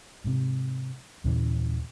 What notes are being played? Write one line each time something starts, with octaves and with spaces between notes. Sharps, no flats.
G#2 C3
D#2 A#2 C#3 E3